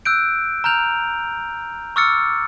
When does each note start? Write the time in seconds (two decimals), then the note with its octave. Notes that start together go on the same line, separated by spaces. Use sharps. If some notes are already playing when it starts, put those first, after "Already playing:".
0.05 E6 F#6 G6 D7
0.64 A#5 F6 G6 F7
1.96 C#6 D6 E6 F6 A6 C#7